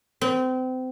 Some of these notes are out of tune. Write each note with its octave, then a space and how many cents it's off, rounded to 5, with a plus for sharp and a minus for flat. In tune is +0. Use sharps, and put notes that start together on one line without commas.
C4 -30